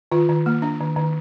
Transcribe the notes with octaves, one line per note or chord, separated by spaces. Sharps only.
D#3 F4
D#3
A#3
D4
D#3
D#3